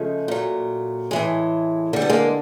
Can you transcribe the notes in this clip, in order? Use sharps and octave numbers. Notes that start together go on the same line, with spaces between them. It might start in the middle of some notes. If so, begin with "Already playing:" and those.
Already playing: C#3 F3 G#3 A3
A#2 F#3
A2 E3 G#3
D3 G3 A#3
B3
G#3 A#3